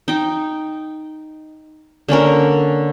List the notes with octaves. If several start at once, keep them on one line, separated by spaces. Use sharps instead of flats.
D#4 G5
D3 A#3 C#4 A#4